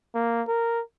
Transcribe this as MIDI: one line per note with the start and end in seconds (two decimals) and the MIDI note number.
0.15 0.42 58
0.47 0.81 70